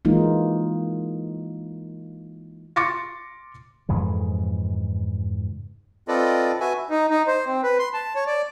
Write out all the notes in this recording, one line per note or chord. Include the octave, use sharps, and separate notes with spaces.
E3 G#3 A#3 D#4 F4
C6 D6 A6 A#6 C#7
F2 G#2 C#3 E3
C4 F4 A4 B4 D5 D#5
F#4 B4 E5 G#5
D#4
D#4
C5
C4
B4
C6
A5
C#5
D5